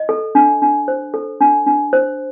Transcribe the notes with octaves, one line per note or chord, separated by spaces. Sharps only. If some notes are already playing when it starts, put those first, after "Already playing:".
Already playing: D#5
A4
D4
D4
C5
A4
D4
D4
C5